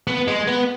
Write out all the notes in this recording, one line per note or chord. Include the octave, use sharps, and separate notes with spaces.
B3
G#3
B3